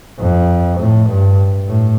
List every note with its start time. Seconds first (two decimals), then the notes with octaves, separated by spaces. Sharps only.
0.20 F2
0.81 A2
1.10 G2
1.69 A2